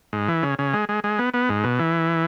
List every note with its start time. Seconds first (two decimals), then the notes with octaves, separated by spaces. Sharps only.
0.13 G#2
0.28 E3
0.43 C#3
0.59 C#3
0.74 G#3
0.89 G#3
1.04 G#3
1.19 B3
1.34 B3
1.49 G#2
1.64 B2
1.79 E3